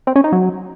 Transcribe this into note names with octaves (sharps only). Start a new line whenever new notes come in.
C4
C#4
D#4
F#3